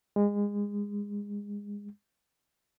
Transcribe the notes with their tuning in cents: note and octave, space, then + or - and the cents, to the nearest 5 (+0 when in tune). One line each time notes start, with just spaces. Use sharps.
G#3 -25